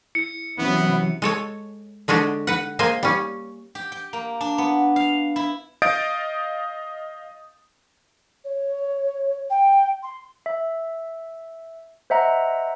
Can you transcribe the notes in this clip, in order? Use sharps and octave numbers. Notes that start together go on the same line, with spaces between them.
E4 C#7
C3 E3 F#3 B3 C#4 E4
G#3 A4 C#5
D3 G#3 C#4 D4
B4 F#5
G#3 A#3 C5 G#5
G3 C#4
G4
G5
A#3
D4
B3
F5
E4
D#5 F5 D#6 G6 A6 D7
C#5
G5
C6
E5
C5 D#5 E5 F#5 A#5